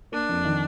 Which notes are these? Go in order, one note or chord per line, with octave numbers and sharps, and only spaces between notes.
A#3 D4
F2
D#3